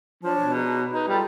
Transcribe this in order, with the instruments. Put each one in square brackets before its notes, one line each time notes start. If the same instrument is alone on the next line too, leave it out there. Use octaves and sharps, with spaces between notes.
[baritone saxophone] F3 [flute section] D4 C#5 A5
[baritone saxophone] B2
[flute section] D#4 G#4
[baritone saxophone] D#4 [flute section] B4
[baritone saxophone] G3 [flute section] F4 A4